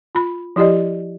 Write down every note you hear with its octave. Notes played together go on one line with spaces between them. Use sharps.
F4 B5
F3 E4 G4 D5 D#5